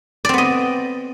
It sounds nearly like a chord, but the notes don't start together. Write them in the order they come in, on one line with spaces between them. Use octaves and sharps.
D5 C4 B3 D#5